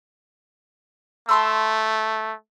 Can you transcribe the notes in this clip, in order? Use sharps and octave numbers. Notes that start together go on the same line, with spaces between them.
A3 A5 C6 E6